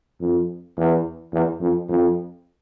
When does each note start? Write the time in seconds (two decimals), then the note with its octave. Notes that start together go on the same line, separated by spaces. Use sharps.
0.20 F2
0.77 E2
1.32 E2
1.61 F2
1.89 F2